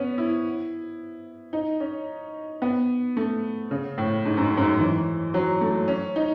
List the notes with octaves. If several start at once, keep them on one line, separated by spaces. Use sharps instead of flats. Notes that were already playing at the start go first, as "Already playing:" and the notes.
Already playing: B3 C#4
E4
D#4
C#4
B3
A3
C#3
A2
G#2
F#2
G#2
F#2
G#2
E3
F#3
A3
C#4
D#4